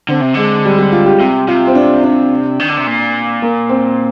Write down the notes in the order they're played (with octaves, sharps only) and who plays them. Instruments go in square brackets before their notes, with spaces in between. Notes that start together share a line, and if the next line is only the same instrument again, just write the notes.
[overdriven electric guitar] D3 [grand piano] C4
[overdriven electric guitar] C3
[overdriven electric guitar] D3 [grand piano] G#3
[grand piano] G3
G3
F4
G4
[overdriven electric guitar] C3 [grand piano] G4
[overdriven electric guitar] C3 [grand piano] F4
[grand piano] C4
D4
D4
[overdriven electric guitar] D#3
D3
C3
A#2
[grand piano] A#3
C4